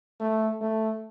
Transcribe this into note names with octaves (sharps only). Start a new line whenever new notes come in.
A3
A3